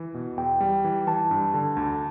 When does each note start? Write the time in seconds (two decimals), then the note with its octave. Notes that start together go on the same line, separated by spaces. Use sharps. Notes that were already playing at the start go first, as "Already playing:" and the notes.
Already playing: E3
0.14 B2
0.37 E2 G5
0.60 G3
0.84 E3
1.07 E3 A5
1.31 G2
1.54 D3
1.77 D2